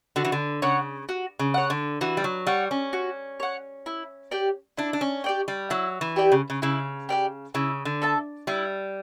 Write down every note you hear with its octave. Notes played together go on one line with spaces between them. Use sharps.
D3 F#4
E3
D3
C#3 C#5 F#5
F#4
C#3
C#5 F#5
D3
E3 F#4
G3
F#3
G3 C#5 F#5
C#4
F#4
C#5 F#5
E4
G4 D5 G5
D4 E4
D4
C#4
G4 D5 G5
G3
F#3 E4
E3
G4 D5 G5
C#3
C#3
C#3 E4
G4 D5 G5
C#3 E4
D3
A4 E5 A5
G3 E4